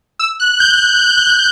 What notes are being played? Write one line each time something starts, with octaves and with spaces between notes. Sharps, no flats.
E6
F#6
G6